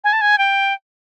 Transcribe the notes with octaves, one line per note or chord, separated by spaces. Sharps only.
G#5
A5
G#5
G5